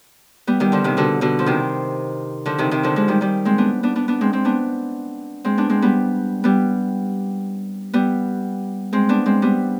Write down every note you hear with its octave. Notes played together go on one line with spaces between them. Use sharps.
G3 B3
D#3 G3
D3 F3
C3 D#3
B2 D3
B2 D3
F3
C3 D#3
D3 F3
C3 D#3
C3 D#3
D3 F3
F3 G#3
D#3 G3
D#3 G3
G#3 C4
B3 D4
B3 D4
B3 D4
B3 D4
G#3 C4
G#3 C4
B3 D4
G#3 C4
B3 D4
G#3 C4
G3 B3
G3 B3
G3 B3
G#3 C4
B3 D4
G#3 C4
G3 B3